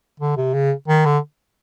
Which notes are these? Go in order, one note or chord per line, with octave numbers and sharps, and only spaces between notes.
D3
C3
C#3
D#3
D3